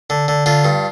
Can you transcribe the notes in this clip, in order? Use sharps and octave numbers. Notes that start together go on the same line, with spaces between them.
D3
D3
D3 F4
G2